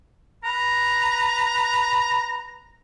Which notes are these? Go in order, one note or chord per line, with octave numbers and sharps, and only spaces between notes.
B4 A#5